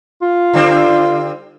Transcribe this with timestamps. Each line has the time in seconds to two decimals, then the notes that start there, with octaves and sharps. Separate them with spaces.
0.22 F4
0.53 D3 G3 C4